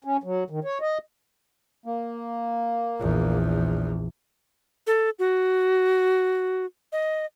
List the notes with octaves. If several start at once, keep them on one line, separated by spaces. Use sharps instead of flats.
C#4
F#3
D#3
C#5
D#5
A#3
A#1 E2
A4
F#4
D#5